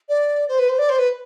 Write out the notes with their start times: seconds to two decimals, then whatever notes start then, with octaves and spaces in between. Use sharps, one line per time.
0.09 D5
0.48 C5
0.59 B4
0.69 C5
0.78 D5
0.89 C5
0.98 B4